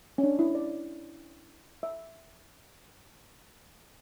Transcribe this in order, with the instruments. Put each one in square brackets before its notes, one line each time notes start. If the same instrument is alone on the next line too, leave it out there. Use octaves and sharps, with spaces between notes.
[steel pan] C#4
D4
E4
D5
E5